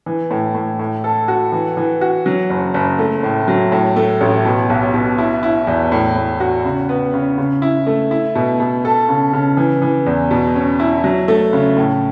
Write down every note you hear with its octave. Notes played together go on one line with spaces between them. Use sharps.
E3
A2
A2
A2
A4
F#4
E3
E3
F#4
F#3
F#1
F#1
A3
A2
F#3
A2
A3
A1
B2
B1
B2
E4
E4
E2
A2
A2
F#4
C#3
B3
C#3
C#3
E4
A3
E4
B2
B2
A4
C#3
C#3
E3
E3
E2
B2
C#4
E4
F#3
A3
C#3
A2